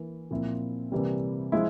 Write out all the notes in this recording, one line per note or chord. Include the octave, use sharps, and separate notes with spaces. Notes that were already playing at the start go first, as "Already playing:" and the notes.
Already playing: E3 A#3 E4
A#2 F3 C4 E4
C3 E3 G3 A#3
F3 G#3 E4